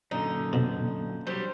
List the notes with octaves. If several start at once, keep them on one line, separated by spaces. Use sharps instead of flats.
F#2 A#2 D3 D#4
F2 B2
F#3 G3 G4 C5